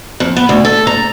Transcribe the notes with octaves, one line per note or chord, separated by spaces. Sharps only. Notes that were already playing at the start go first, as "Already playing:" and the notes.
F2
B3
D2
A4
A#5